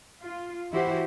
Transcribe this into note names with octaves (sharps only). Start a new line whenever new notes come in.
F4
E3 E4 F#4 G4 C5